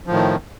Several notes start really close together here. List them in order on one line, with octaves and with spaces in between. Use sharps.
F3 A2 D#3